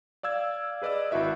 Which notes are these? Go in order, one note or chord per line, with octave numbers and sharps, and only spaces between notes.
D5 F5 E6 G#6
G#4 B4 D5 D#5 E6
G#1 E4 F#4 E5 E6